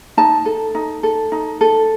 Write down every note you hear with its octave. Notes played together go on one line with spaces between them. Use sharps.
D#4 A5
A4
D#4
A4
D#4
A4